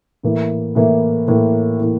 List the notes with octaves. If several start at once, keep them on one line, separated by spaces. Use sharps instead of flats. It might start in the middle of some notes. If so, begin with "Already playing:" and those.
A2 E3 A#3 E4
A2 E3 A#3 E4
A2 E3 A#3 E4
A2 E3 A#3 E4